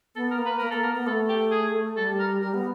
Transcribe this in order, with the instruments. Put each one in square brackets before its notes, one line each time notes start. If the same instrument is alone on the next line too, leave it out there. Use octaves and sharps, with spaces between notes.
[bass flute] B3 [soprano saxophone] A4
[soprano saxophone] A#4
[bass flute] A#3
[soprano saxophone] B4
[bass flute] A#3 [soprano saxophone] A#4
[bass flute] A#3 [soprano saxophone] A4
[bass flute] B3 [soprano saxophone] A#4
[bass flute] B3
[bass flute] A3 [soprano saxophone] A4
[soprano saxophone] G4
G#4
[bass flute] G3 [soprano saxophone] A4
[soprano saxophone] A#4
[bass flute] G3 [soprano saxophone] A#4
[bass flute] B3